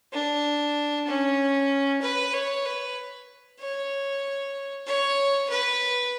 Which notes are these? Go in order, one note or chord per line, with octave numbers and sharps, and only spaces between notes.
D4
C#4
B4
C#5
B4
C#5
C#5
B4